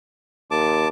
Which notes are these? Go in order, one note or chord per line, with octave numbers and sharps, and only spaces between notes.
D#2 A5 D6